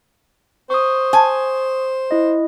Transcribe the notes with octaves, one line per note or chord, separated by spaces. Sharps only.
C5 C#6 D#6
G#5
E4 D#5